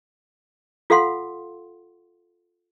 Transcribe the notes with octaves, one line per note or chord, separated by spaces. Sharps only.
F4 A4 F5 F#5 C6